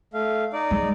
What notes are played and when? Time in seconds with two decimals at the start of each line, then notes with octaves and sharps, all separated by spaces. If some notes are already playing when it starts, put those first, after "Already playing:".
0.14 A3 F5
0.53 D#4 D5
0.71 G#3